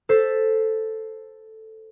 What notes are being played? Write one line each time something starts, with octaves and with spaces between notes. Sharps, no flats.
A4 C5 A6 B6 C7